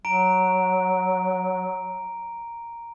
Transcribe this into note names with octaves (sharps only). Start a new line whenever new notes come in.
F#3 A#5 D7